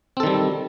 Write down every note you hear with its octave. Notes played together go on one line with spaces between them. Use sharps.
D#3 G3 C4 A4